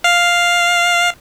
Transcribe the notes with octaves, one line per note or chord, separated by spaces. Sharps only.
F5